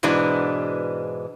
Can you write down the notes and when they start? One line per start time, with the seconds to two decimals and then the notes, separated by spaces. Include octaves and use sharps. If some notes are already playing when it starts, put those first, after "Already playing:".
0.03 G#2 B2 E3 G#3 D4